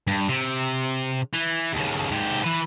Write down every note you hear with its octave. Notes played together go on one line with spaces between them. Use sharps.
G2
C3
E3
D#2 C#3
G#2 G4
E3 B4